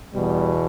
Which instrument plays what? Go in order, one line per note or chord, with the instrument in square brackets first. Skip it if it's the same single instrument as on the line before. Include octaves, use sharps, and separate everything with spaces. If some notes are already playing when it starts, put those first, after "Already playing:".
[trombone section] E2 B2 G3